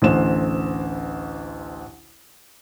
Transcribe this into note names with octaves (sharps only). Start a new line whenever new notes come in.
A1 D2 C5 E7